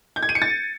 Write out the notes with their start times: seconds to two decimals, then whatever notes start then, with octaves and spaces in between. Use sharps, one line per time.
0.16 G6
0.23 G#6
0.29 D#7
0.35 C#7
0.42 A6